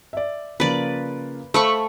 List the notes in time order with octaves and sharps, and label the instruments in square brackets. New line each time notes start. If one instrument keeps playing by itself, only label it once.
[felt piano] D5 E5
[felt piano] C#3 F3 A#3 [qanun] B4 D5
[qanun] A3 B5 C#6 [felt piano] C5 F5